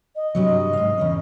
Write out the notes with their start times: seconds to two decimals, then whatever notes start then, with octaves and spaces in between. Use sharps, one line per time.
0.16 D#5
0.35 G2 C3 F#3
0.73 G#2 F5
0.98 E2 C#3 C#4